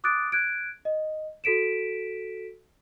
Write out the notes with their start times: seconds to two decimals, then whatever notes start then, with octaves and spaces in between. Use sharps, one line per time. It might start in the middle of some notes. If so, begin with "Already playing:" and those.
0.04 D6 D#6 F#6 A6 D7
0.32 F#6 G#6 D7
0.85 D#5
1.44 F#4 A4 B6 D7 E7